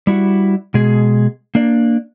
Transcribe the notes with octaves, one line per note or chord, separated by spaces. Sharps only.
G3 E4 F#4
B2 G#3 G#4
A#3 D4 D5